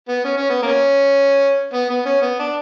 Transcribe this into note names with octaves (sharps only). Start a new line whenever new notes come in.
B3
C#4
C#4
B3
A#3 C#4
B3
B3
C#4
B3
D4